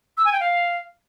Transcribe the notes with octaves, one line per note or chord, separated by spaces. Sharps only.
E6
G#5
G5
F5